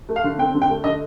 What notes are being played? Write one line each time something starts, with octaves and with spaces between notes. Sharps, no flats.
A3
F5
D3
C4 G5
D3
G5
A3
D3 D#5